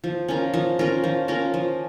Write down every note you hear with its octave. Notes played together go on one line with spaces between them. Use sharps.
F3
C#4 F4 A#4
F3
C#4 F4 A#4
F3
C#4 F4 A#4
F3